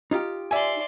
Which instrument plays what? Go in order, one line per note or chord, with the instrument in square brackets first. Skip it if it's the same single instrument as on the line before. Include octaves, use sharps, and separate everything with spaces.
[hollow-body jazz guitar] D#4 F4 G4
[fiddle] D5 C6 [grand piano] E5 G#5